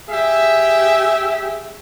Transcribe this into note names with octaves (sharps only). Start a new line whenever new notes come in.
G4 G#4 E5